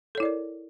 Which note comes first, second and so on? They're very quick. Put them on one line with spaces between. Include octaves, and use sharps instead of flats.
A4 C#5 E4 D5 A#4